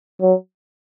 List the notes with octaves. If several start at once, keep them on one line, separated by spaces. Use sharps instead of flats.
F#3